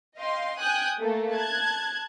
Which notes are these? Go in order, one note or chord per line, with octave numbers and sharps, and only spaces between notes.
D#5 F5 G5 C6
G5 G#5 D#6 F#6 G6
A3 A#3 A4
A5 F#6 G#6